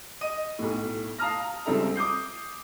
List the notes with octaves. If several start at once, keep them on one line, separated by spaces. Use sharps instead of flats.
D#5 D#7
B1 A2
F5 A5 A#5 D#6 F6 A#6
A#5
C#2 G3 C4 A4 E5 A#5
D6 D#6 G6 C7